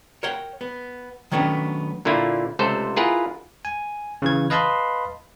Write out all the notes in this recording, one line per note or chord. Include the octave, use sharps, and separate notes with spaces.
A#4 C#5 F#5 G5
B3
D#3 F#3 A3 B3 C#4 D4
A#2 D3 A#3 E4 F4
C#2 C3 A3 A4 C5
E4 F4 G#4 A#4 B4 F#5
G#5
C#3 E3 G#6
B4 D#5 F5 A5 B5 C6